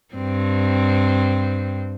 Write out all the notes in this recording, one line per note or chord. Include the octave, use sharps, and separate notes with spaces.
G2 C4